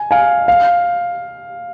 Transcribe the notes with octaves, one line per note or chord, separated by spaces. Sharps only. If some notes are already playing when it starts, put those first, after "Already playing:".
Already playing: G#5
F5 G#5
F5